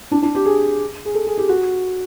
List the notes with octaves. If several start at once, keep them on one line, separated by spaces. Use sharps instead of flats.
D4
D4
G4
G#4
G#4
A4
G#4
G4
F#4